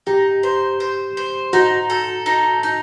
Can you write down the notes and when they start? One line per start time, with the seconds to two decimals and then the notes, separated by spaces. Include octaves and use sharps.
0.07 D#4 G4
0.43 C5
0.80 C5
1.17 C5
1.53 D#4 F#4
1.90 A4
2.26 D#4
2.63 D#4